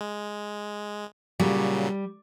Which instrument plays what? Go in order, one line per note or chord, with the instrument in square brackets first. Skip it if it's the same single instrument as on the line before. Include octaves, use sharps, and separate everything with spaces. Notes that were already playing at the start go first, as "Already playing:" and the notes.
[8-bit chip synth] G#3
[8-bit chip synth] A#2 C#3 F#3 [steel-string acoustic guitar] G3